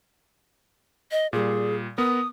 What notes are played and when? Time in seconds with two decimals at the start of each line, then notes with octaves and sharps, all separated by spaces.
1.11 D#5
1.33 A#2 G3 G#4
1.98 B3 A#4 D#6